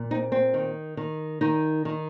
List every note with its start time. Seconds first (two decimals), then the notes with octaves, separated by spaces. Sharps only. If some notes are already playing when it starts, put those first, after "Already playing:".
Already playing: A#2
0.11 C4 D#4
0.32 C4
0.54 D#3
0.97 D#3
1.41 D#3 D#4
1.85 D#3